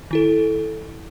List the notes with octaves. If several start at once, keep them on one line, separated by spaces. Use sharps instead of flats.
D#3 E4 A4